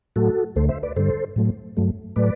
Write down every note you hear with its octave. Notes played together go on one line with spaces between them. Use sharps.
A2 F#3 A3 F#4 A4
D2 D3 A3 A4 C5
C5 E5
B4 D5
G2 D3 G3 A4 C5
A2 F#3 A3
G2 F#3 A3
A2 F#3 A3 B4 D5